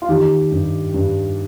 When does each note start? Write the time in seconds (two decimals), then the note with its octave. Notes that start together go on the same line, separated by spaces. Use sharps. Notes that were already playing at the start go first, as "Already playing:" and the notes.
0.02 F4
0.09 D#3 G4
0.51 G2
0.94 G2